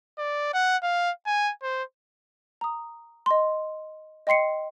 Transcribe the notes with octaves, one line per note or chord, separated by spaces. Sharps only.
D5
F#5
F5
G#5
C5
A#5 D#6
D#5 C6
D#5 G5 C6 C7 C#7